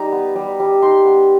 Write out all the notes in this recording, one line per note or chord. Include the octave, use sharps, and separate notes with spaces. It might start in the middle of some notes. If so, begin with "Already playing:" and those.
Already playing: G3 D#4 A#5
B3
G3
G3
D#4 C6
B3